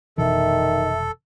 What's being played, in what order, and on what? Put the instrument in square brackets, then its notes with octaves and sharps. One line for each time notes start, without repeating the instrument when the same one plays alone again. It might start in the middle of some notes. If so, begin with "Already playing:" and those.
[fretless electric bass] F1 B2 E3 [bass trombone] D#3 [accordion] A4 [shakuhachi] E5